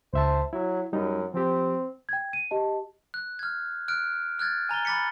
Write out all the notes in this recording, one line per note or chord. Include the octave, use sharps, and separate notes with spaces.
C#2 C5 E5 A5
F#3 E4
F#2 G3 D#4
F3 C4 G4
G5 G#6
D#7
G4 D#5 A5
F#6
F6 G#6
F6 F#6 D7
F6 F#6 G#6 A6
G#5 A#5 A6 G7
B5 D6 A6 B6 C#7